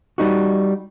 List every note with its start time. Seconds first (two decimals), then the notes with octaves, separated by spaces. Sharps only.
0.18 G3 D#4 F#4